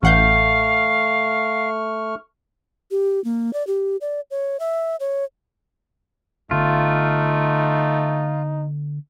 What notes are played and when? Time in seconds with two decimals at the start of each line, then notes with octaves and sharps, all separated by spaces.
0.03 A1 A3 F5 F#5 C#6 F6 G6
2.91 G4
3.24 A#3
3.53 D5
3.67 G4
4.01 D5
4.31 C#5
4.60 E5
5.00 C#5
6.51 D3 A3 B3 D#4 F4